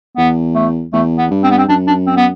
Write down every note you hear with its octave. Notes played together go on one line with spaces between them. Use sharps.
E2 B3
A3
E2 A3
B3
G2
C4
B3
C4
F#2 D4
D4
C4
B3